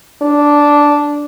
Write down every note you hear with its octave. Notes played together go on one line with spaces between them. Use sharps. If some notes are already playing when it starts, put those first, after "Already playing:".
D4